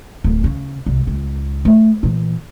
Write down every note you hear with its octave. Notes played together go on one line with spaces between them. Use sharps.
D1
C#3
C2
C#2
A3
A#2 E3